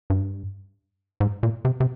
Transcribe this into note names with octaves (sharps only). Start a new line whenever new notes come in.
G2
G#2
A#2
C3
C3